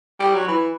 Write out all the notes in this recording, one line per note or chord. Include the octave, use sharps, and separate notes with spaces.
G3
F#3
E3